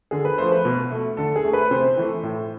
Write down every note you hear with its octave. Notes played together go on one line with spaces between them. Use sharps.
D3 G#4
B4
F3 A3 C5
B4
B2
A3
D3 A4
G#4
A3
B4
C3 C5
E3 A3
A2